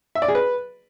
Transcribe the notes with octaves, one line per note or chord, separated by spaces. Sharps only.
E5
D5
G#4
B4